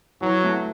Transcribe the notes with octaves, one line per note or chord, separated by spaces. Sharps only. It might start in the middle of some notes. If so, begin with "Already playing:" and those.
E3 F#3
A3